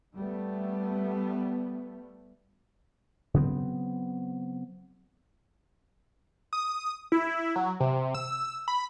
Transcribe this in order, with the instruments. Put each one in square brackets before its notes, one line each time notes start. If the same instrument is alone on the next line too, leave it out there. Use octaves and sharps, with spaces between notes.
[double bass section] G3 A3 B3
[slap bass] C#3 F#3 B3 C4
[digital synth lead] D#6
E4
F#3
C3
E6
B5